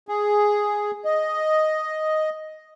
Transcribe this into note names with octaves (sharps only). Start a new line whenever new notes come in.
G#4
D#5